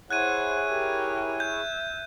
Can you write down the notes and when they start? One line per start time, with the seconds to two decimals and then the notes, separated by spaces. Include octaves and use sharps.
0.11 E4 G#4 C5 C#5 F#5 F#6 G#6 D#7
0.70 G4 A#4
1.40 E5 G6